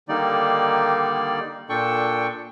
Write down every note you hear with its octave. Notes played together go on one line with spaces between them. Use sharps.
D3 D#3 G3 A#3 D#4 D5
A#2 D4 A4 G5 C#6